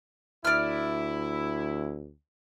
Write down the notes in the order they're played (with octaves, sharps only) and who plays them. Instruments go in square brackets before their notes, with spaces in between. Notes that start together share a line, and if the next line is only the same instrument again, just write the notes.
[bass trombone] D2 [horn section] E4 [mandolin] D5 F6